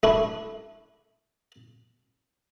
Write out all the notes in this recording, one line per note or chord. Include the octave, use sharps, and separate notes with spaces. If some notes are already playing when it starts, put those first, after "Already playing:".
A3 D4 E4